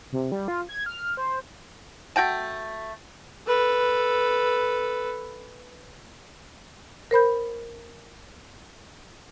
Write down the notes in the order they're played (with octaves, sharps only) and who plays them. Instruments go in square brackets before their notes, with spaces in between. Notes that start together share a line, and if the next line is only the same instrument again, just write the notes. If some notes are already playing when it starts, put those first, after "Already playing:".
[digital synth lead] C3
G3
F4
G#6
F6
C5
[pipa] A3 F#4 G5 A5
[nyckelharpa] A4 B4
[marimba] A#4 C5 B5 G6